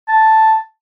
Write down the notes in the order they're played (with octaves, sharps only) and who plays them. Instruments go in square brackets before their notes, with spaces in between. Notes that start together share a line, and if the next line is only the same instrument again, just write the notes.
[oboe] A5